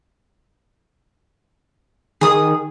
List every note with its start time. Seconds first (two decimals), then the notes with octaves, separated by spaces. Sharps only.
2.21 D#3 G#4 D#6